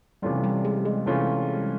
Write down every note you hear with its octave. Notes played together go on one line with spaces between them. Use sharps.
C3 E3 G3 A3 C#4 F4
G3
G#3
G#3
C3 E3 A3 C#4 F4